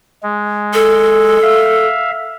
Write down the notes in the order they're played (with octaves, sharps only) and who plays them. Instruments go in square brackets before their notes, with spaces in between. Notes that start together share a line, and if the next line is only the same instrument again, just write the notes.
[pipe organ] G#3
[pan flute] A4
[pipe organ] E5 F5